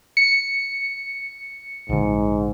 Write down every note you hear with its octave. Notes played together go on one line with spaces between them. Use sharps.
C#7
A#1 G#2 D3